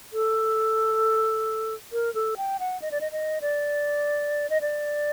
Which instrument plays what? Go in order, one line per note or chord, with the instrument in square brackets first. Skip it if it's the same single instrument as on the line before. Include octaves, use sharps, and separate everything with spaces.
[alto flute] A4
A#4
A4
G5
F#5
D#5
D5
D#5
D#5
D5
D#5
D5